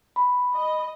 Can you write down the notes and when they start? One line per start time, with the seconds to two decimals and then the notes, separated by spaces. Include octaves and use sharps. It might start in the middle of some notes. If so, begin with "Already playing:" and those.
0.16 B5
0.55 D#5